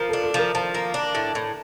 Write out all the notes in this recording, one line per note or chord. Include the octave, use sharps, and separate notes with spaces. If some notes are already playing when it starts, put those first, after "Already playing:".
Already playing: F3 A#4
D4 A4
A4
F3 A#4
F3 A5
A#3
D4
A2
A2